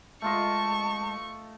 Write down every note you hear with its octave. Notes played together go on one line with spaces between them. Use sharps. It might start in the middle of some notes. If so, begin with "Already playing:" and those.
G#3 A3 F4 D#5 A5 C#6